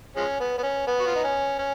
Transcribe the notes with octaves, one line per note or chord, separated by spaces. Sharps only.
F3 G#3 C#4
B3
B3
C#4
B3
F#4
F4
D#4
C#4
C#4